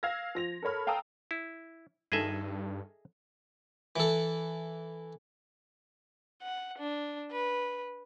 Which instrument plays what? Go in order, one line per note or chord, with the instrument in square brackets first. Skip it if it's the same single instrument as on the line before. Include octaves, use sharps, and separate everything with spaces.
[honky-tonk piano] F5 E6 F6 G#6 A#6
F3 A#6 F7
A4 A#4 C#5 B5 F6
F5 G5 A5 A#5 D#6 E6
[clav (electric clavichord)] E4
[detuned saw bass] G2 [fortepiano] D#3 A4 G#5 [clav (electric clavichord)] G#4 D#5 E5
[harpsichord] E3 A4
[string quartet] F#5
D4
B4